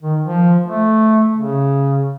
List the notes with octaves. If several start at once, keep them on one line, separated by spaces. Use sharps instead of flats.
D#3
F3
A3
C#3